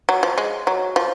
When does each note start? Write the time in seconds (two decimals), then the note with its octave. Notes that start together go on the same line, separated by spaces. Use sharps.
0.09 F#3
0.23 F3
0.38 G#3
0.67 F#3
0.96 F3